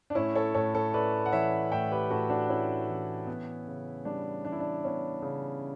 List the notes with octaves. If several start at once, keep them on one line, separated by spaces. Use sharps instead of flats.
D4
A2 C#4 E4
A4 C#5
A2 A4 C#5
A4 C#5
A3 B4 D5
F#5
E3 C#5 E5
A2 E5 G5
G4 B4
A2 F#4 A4
D4 F#4
A3 C#4 E4
E3
B3
C#3
G3 D4
E3 D4
E4
D4
B3 C#4
C#3